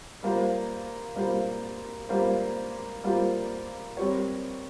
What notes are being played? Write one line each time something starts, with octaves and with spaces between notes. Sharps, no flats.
G3 A#3 F4 C5
G3 A#3 F4 C5
G3 A#3 F4 C5
G3 A#3 F4 C5
G3 C4 G4 A#4 C#5